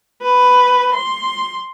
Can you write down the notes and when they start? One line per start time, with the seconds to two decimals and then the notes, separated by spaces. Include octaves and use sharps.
0.23 B4
0.95 C6